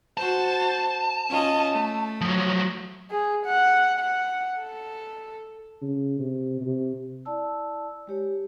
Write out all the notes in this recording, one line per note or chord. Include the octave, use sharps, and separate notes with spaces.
F#4 C5 A5
C#4 F4 D#5
A3
F3 F#3
G#4
F#5
F#5
A4
C#3
C3
C3
E4 D5 A5 E6
G#3 G4 C#5